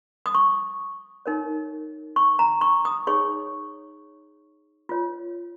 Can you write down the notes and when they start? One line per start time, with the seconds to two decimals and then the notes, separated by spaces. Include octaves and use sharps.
0.26 D#6
0.34 C#6
1.26 D#4 A#4 C#5
2.16 C#6
2.39 A#5
2.61 C#6
2.85 D#6
3.07 D#4 G#4 C#5 C#6
4.89 F4 C#5